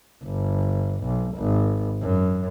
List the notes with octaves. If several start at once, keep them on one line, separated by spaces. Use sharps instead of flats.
G1
B1
G#1
F#2